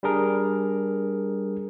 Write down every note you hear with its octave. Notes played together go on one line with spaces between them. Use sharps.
G3 D4 G#4 A#4